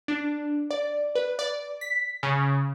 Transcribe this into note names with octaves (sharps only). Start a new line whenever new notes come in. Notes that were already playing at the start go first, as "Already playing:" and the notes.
D4
D5
B4
D5
B6
C#3